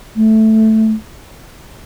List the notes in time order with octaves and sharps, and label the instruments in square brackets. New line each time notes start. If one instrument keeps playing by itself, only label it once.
[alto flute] A3